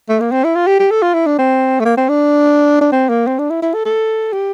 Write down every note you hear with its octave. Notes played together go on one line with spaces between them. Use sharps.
A3
A#3
C4
E4
F4
G4
G4
A4
F4
E4
D4
C4
A3
A#3
C4
D4
D4
C4
A#3
C4
D4
E4
E4
A4
A4
G4